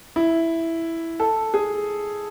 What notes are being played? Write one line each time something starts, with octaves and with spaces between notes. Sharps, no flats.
E4
A4
G#4